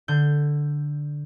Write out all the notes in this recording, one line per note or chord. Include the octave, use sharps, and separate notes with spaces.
D3 G6